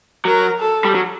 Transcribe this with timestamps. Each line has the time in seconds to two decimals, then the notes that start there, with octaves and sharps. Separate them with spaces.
0.25 F#3 A#4
0.60 A4
0.85 G3
0.95 F#3